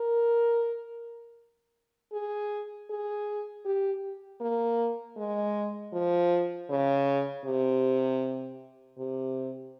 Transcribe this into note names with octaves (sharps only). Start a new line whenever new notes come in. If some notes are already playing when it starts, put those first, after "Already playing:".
Already playing: A#4
G#4
G#4
G4
A#3
G#3
F3
C#3
C3
C3